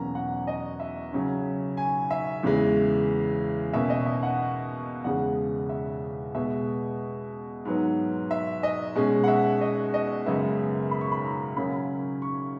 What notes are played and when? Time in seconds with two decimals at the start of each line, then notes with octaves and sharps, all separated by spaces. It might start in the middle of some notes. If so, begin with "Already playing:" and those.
Already playing: E2 B2 F#3 A#3 C#4 A#5
0.15 F#5
0.47 D#5
0.80 E5
1.13 C#3 F#3 C#4
1.77 G#5
2.11 E5
2.43 E2 C#3 E3 G#3
3.73 B2 A#3 C#4 E5
3.90 D#5
4.06 E5
4.23 F#5
5.04 E2 C#3 G#3 F#5
5.69 E5
6.34 B2 G#3 B3 E5
7.65 G#2 F#3 B3
8.31 E5
8.63 D#5
8.95 B2 G#3 C#4
9.24 F#5
9.28 E5
9.61 D#5
9.94 D#5
10.26 F#2 C#3 G#3 B3 E5
10.91 B5
11.01 C#6
11.12 B5
11.24 A#5
11.57 C#3 F#3 A#3 C#4 B5
12.22 C#6